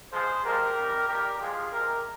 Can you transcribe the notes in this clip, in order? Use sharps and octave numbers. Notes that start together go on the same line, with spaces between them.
G2 F3 G#3 G#4 C5
A#2 F3 G#3 G4 A#4
C3 D#3 G3
F2 D#3 G3 G4 A#4
A#2 F3 G#3 F4 G#4
C3 F3 G#3 G4 A#4